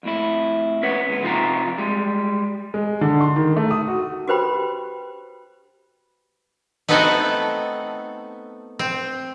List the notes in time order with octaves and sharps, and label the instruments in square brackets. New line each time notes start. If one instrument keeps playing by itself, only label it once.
[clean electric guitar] F2 A2 E4
C#4 B4 C#5 F#5
C#2 B3
C3 F3 D#4 F4 E5 A#5
G3 G#3
[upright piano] G#3
D3
C6
D#3
A3
D#6
F#4
[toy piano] F#4 G4 B4 C5 G5 B5
[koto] A3 B3 C4 D#4 F#4 A4
C4